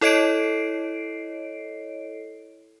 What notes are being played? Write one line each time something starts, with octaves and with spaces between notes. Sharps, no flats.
E4 A4 C#5 D#5 C7 D7